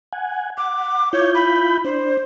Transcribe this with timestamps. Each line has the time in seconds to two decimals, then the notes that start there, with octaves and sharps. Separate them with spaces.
0.13 F#5 G#5
0.58 F#5 D6
1.13 E4 F4 C#5 G6
1.35 B5
1.84 D4 C5